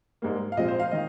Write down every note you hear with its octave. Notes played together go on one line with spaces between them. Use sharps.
G#2 G3 A#3
F5
A#2 F3 G#3 C4 D#5
C5
F5
D#3 D#5